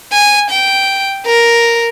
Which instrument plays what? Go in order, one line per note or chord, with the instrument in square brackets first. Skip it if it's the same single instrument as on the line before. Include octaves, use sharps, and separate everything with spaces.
[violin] G#5
G5
A#4